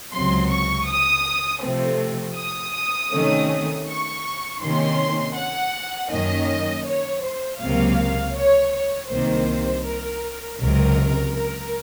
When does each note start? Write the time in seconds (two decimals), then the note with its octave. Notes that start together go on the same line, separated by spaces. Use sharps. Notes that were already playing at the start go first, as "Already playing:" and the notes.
0.13 C#2 C3 F#3 C6
0.51 C#6
0.88 D#6
1.63 C3 F3 A3 C4
2.37 D#6
3.12 C3 D#3 A3 C#4
3.88 C#6
4.62 C3 D#3 A#3 C#4 C6
5.37 F#5
6.12 F#2 D#3 A#3 C#4 D#5
6.87 C#5
7.24 C5
7.61 C#2 C3 F#3 A#3 F5
8.37 C#5
8.74 C#5
9.11 C2 C3 D#3 A#3 C5
9.85 A#4
10.60 C#2 C3 F#3 A#4
11.35 A#4